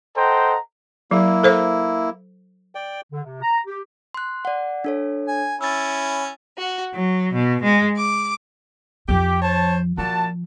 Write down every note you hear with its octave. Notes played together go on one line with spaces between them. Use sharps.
A4 C5 D#5 F#5 G5 A#5
F#3 A#3 E4
A4 C5 E5
D5 G5
D3
C3
A#5
G4
C6 F#6
D5 F#5
D4 A4 C#5
G#5
C#4 E4 E6 A6
F#4
F#3
B2
G#3
D6
F2 F3 G4
C5 C#5 A5
A#2 F3 F#4 A5